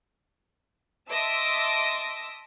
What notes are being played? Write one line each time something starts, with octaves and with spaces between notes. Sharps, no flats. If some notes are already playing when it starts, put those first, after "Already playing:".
D#5 E5 A5 C6 D6 E6